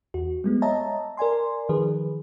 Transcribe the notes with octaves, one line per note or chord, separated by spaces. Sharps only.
E2 F#4
G3 G#3 B3
C#5 D#5 E5 A5 A#5
A#4 D5 G#5 C6
D#3 F3 G#4 B4